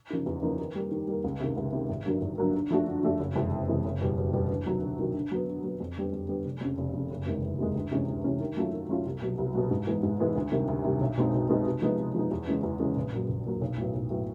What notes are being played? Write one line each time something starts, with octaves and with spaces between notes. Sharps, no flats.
C#3 F3 A#3 D#4
E2
C#3 F3 A#3 D#4
D#3
G3 A#3
D#3
G3 A#3
C#2
C3 D#3
C#2
C3 D#3
G#1
G2 D3 F#3 A#3
G#1
G2 D3 F#3 A#3
D3
F3 A3 D4 F#4
D3
F3 A3 D4 F#4
F#1
F2 C3 E3 G#3
F#1
F2 C3 E3 G#3
F#1
E2 B2 G3
F#1
E2 B2 G3
D2
C3 D#3 F#3
D2
C3 D#3 F#3
D3
F#3 B3
D3
F#3 B3
F2
D3 G3 B3
F2
D3 G3 B3
F1
F2 C#3
F1
F2 C#3
F#1
E2 C3 D#3 G#3
F#1
E2 C3 D#3 G#3
D2
C3 E3 G#3 C#4
D2
C3 E3 G#3 C#4
D#3
F#3 A3 C#4 F4
D#3
F#3 A3 C#4 F4
C2
B2 F#3
C2
B2 F#3
G#2
E3 G#3 B3
G#2
E3 G#3 B3
D2
C3 D#3 G3
D2
C3 D#3 G3
B1
B2 G#3 C4 D#4
B1
B2 G#3 C4 D#4
C3
F3 G#3 B3 D#4
C3
F3 G#3 B3 D#4
E2
C#3 E3 G#3 C#4
E2
C#3 E3 G#3 C#4
A#1
A#2 F#3
A#1
A#2 F#3
B1
A2 F#3 B3
B1
A2 F#3 B3